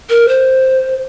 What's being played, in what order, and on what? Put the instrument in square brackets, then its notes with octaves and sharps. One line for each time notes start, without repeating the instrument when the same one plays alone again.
[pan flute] A#4
C5